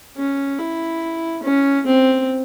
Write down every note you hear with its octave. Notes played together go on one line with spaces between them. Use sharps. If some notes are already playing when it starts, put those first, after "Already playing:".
C#4
E4
C#4
C4